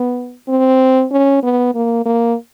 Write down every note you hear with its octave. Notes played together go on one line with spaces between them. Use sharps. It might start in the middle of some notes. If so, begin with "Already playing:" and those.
Already playing: B3
C4
C#4
B3
A#3
A#3